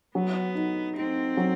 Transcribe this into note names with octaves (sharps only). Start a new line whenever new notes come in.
F#3 B3
D#4
C4 D#4
F#3